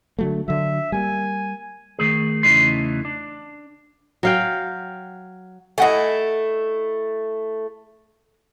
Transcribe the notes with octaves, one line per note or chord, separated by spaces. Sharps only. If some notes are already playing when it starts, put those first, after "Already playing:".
D3 F#3 A3
D3 F#3 E5
G3 A3 A#3 G#5
D#3 A3 G#4
E2 C#3 E3 A3 D#4 C6
D4
F#3 F5 G5
A3 E4 D#5 F#5 G#5